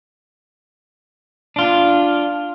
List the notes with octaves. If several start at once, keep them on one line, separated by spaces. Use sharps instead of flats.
D4 F4